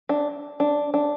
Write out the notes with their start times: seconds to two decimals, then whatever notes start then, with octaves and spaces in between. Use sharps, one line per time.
0.09 D4
0.60 D4
0.94 D4